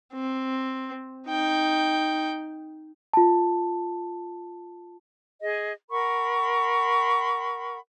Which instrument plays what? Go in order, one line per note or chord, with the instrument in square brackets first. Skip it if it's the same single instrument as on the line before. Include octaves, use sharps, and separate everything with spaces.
[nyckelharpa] C4
D#4 G5
[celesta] F4 A5
[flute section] G#4 D#5
A#4 F#5 B5 C#6